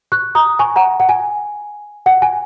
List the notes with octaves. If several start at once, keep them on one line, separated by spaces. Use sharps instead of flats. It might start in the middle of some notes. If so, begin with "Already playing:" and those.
C#6 F#6
A#5 D#6
G#5 C#6
F#5 A#5
F#5
G#5
F#5
G#5